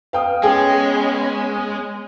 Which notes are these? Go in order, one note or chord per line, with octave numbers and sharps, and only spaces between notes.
B4 F5 G5 D#6
G#3 B3 C#4 G#4 A4 G5 G#5